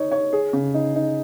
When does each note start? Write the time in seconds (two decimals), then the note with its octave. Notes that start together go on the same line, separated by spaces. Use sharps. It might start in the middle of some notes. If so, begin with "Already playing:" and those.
Already playing: D#4 C#5
0.11 C#5
0.33 G#4
0.53 C#3
0.74 D#4
0.95 D#4